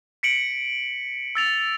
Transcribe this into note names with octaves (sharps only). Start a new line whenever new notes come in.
B6 C#7 D7 F#7
E6 A6 F7